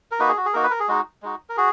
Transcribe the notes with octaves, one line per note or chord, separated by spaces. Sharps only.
A#4
A#3 D#4 F#4 B4
G#4
F#4
G#4
A#3 D#4 F#4 A#4
B4
A#4
G#4
G#3 D#4 F#4
G#3 D#4 F#4
A#4
F#4 G#4